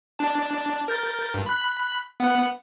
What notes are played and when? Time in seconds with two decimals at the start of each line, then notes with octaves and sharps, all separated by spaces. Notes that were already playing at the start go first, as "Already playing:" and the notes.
0.19 D4 A5
0.88 A#4 G6 A6
1.34 G2
1.46 B5 F#6
2.20 B3 F#5